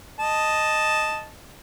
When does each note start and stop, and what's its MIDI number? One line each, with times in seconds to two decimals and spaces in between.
0.20 1.29 75
0.20 1.29 81